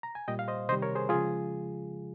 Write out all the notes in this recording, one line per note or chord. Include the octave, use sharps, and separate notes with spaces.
A#5
G#5
A#2 G3 D#5 G5
F5
C5 D#5
C3 D#3 G3 C5 D#5
A#4 C#5
G#4 C5
C#3 F3 G#3 F4 G#4